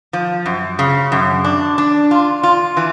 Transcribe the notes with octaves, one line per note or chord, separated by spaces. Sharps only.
F3
F#2
C#3
F#2
D4
D4
F4
F4
E3